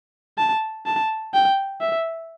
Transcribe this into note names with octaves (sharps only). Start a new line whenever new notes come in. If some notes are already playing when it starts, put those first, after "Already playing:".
A5
A5
G5
E5